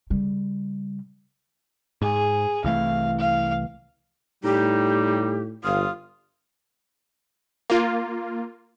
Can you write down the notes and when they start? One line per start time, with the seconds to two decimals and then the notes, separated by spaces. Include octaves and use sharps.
0.10 C#3 G3
2.01 G#2 G#4
2.64 C2 E3 A3 F5
3.19 F5
4.44 A2 G3 D#4 G4
5.64 G1 F4 F5 D#6
7.70 A#3 F4